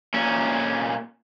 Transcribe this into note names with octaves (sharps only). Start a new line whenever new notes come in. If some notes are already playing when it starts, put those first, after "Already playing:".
A#2 C#4